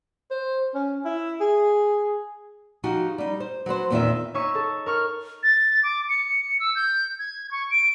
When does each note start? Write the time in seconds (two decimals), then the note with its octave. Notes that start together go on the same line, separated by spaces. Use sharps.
0.31 C5
0.74 C#4
1.05 E4
1.40 G#4
2.84 F3 D#4 F#4 G4
3.18 G3 D#4
3.40 C5
3.66 F#3 F#4 B4 C5
3.90 E2 A#2 D#3 C4 F4 E5
4.34 D#4 C#5 C#6 E6 B6 D#7
4.55 A4
4.86 A#4 C#6 F6
5.43 A6
5.83 D6
6.09 C#7
6.60 E6
6.75 G6
7.19 G#6
7.51 C#6
7.71 D7